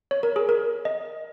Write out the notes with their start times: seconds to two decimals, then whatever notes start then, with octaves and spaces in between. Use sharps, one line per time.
0.11 C#5
0.23 A#4
0.36 G#4
0.49 A#4
0.85 D#5